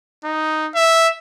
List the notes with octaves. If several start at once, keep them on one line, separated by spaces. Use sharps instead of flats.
D#4
E5